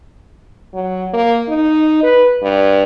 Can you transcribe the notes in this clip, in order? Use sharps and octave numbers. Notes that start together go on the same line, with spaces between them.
F#3
A#3
D#4
B4
G2